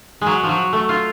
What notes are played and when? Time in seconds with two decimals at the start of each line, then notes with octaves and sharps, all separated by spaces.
0.21 F#3 G#3
0.43 F3
0.49 F#3
0.73 A3
0.89 F4